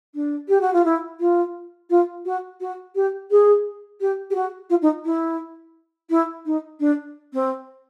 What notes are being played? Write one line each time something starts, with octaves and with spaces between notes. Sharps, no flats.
D4
G4
F#4
F4
E4
F4
F4
F#4
F#4
G4
G#4
G4
G4
F#4
F4
D#4
E4
E4
D#4
D4
C4